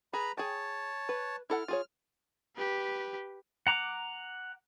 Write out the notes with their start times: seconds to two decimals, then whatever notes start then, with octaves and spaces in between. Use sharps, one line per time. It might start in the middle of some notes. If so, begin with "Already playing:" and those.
0.13 G#4 B4 A#5 B5
0.37 G#4 C#5 G5 A5
1.09 B4
1.50 E4 A4 F#5 F6
1.68 F4 G#4 C#5
2.57 G4 B4
3.67 F#5 A#5 D6